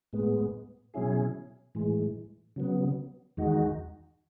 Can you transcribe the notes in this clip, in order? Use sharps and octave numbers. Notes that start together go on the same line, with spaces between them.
A2 G#3 B3
B2 F#3 C#4 E4 G#4
A2 E3 G#3
C#3 F#3 B3
E2 D#3 G#3 D#4 F#4